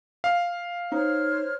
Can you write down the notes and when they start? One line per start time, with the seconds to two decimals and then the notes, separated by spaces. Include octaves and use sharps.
0.24 F5
0.92 D#4 C5 C#5 F6